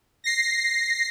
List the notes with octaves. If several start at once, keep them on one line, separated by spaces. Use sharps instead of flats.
A#6 C7